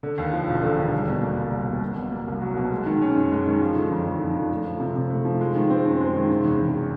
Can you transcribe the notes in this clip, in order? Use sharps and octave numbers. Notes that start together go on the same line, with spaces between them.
D3
D#2
F3
E1
D3
D#2
G3
B2
A#3
C2
G3
B2
F#3
B2
A#3
C2
F#3
B2
G#3
D#3
C#4
F#2
G#3
D#3
F3
D3
F2
F2
F3
D3
A3
F3
C3
C3
A3
F3
G#3
D#3
C4
F#2
G#3
D#3
C3
E2
E1